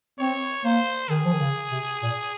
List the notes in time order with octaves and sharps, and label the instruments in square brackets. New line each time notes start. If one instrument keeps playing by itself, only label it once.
[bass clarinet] C4 [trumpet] C#5
[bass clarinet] A#3 [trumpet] C5
[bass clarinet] D#3 [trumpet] G#4
[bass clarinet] F3
D#3
C#3
C3
A#2